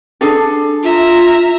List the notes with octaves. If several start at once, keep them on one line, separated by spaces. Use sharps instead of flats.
D4 G#4 A4
F4 E5 A#5